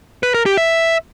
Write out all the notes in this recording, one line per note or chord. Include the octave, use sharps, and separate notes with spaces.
B4
A#4
G4
E5